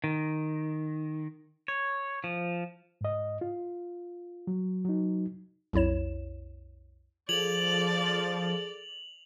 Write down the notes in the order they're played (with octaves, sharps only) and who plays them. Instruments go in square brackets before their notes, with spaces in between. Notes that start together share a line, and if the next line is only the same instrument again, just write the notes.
[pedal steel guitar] D#3
C#5
F3
[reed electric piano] G#2 D#5
F4
F#3
F#3 D#4
[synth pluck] B1 F2 E4 C#5 E7
[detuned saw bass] F3 [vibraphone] G#4 A4 [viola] D5 [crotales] F7 F#7